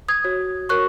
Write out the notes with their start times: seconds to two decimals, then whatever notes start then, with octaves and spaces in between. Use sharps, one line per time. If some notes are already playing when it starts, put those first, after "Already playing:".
0.08 D#6 G#6
0.24 F#4 C#5
0.69 F#4 A#4 C#5 C#6 F#6